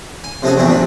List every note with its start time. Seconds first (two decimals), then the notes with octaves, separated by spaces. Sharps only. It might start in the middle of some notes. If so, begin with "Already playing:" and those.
0.24 G#5
0.43 C3 F3 A3 C#4 F#4 G#4
0.56 A#1 E2 G2 C4 D4 C#6
0.68 D2 F3 D5